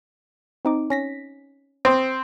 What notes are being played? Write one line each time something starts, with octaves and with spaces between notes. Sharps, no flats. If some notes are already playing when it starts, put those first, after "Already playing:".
C4 D#4 D6
C#4 A#6 B6
C4 D#6